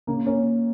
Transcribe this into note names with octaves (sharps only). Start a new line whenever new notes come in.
C#3 A#3
A#3 C#4